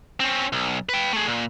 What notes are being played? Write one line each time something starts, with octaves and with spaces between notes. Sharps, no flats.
C4 C#4
B1
B4 G5
A3 G#4
A#2